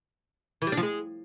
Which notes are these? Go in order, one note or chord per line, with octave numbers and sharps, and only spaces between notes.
E3
G3
D4
F3
G#3